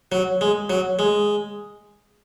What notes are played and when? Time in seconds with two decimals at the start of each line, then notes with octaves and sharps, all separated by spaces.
0.12 F#3
0.41 G#3
0.70 F#3
0.99 G#3